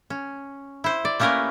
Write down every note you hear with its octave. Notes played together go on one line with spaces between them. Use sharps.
C#4
E4 C5
D5
A3 A#3 C#4 G4 A#4 B4